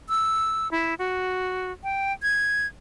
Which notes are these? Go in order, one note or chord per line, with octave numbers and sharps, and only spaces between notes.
E6
E4
F#4
G5
G#6